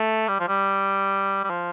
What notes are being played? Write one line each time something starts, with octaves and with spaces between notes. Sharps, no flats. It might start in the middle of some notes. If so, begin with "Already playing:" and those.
Already playing: A3
G3
F3
G3
G3
F3